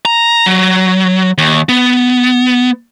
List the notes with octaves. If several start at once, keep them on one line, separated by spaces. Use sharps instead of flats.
A#5
F#3
D#2
B3